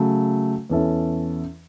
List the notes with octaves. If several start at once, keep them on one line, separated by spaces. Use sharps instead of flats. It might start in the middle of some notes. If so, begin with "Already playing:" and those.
Already playing: C#3 F#3 A3
E2 E3 C#4 A4 E5